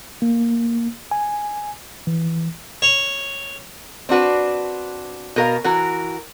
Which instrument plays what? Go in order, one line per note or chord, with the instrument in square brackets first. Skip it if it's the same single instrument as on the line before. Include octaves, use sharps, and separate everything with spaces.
[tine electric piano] A#3
G#5
E3
[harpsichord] C#5
[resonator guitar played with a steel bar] C4 D4 F#4 B4
B2 A#4 F5
E3 F#4 A#4